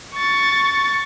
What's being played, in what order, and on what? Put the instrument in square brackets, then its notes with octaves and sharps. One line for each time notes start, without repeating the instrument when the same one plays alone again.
[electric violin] C#6 A6